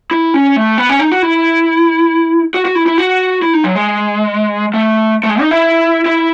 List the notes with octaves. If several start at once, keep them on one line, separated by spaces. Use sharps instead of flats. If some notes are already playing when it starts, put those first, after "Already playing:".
E4
C#4
A3
B3
C#4
D#4
F#4
E4
F#4
F#4
E4
E4
F#4
E4
D#4
F#3
G#3
A3
A3
G#3
D#4
E4
E4